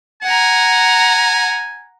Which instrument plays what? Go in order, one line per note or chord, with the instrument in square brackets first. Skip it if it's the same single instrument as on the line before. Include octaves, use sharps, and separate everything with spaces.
[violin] F#5 A#5 [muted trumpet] G#5